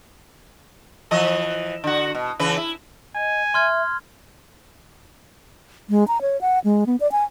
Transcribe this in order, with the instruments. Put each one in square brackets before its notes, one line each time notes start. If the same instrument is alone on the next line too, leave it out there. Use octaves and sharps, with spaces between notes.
[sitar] E3 F3 D#5
D3 F#4
B2
C#3 E3 B4
E4
[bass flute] D#5 [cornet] G#5
[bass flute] E5 [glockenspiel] C6 F6 G#6
[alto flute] G#3
A#5
C#5
F#5
G#3
B3
D5
G#5